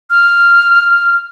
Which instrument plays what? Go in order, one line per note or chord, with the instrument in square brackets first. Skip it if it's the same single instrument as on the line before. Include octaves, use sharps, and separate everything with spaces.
[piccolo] F6